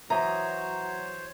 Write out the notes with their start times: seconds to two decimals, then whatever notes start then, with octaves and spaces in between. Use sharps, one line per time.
0.10 E3 F#3 C5 C#5 D#5 A#5